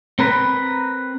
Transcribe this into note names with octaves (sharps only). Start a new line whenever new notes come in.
C4 A#4 B4